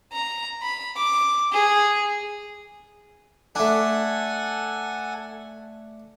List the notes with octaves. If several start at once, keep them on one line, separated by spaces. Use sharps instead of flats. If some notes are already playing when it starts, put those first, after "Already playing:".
A#5
B5
D6
G#4
A3 D4 A4 F#5 G#5